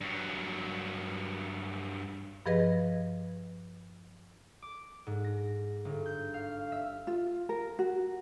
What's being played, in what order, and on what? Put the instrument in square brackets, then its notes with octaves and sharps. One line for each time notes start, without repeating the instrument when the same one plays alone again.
[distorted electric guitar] G2 F#3
[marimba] G2 F3 G#4 B4 D#5 A#6
[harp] D6
G#2
A#6
G1
G6
F5
E5
[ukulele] F4
A#4
F#4